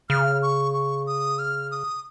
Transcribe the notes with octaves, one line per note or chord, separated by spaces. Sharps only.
C#3 F6
C#6
C#6
D#6
F6
D#6